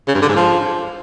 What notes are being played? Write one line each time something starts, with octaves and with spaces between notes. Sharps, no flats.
C#3
G2
D3
G#2
F3